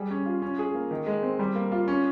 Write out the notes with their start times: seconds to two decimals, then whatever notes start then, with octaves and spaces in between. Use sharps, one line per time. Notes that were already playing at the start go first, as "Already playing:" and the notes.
Already playing: G3 G#4
0.10 C#4
0.26 F4
0.42 C#4
0.59 G#4
0.75 A#3
0.91 D#3
1.07 G#3
1.23 C4
1.39 G3
1.55 A#3
1.72 F4
1.88 C#4